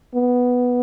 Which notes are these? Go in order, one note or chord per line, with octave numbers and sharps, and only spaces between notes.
B3